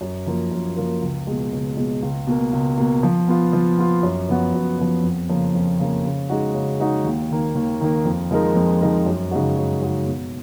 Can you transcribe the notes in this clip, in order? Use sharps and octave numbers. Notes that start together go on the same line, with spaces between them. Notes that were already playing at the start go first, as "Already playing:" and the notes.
F#2
F3 A#3 F4 A#4
F#2
F3 A#3 F4 A#4
C#2
B2 G#3
C#2
B2 G#3
C#2
B2 A#3
C#2
B2 A#3
F3
B3 F4
F3
B3 F4
F#2
F3 B3 F#4
F#2
F3 B3 F#4
F2
C#3 F3 A#3
F2
C#3 F3 A#3
C#3
G#3 D#4 F#4
C#3
G#3 D#4 F#4
D#2
D#3 A#3
D#2
D#3 A#3
F2
F3 G#3 D#4 A#4
F2
F3 G#3 D#4 A#4
F#2
C#3 G#3 D#4 F#4
F#2
C#3 G#3 D#4 F#4
B2